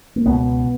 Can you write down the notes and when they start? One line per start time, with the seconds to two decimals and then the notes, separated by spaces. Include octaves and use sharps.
0.16 A#3
0.26 C#2 B2 B3